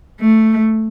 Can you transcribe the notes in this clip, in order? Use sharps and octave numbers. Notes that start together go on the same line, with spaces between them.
A3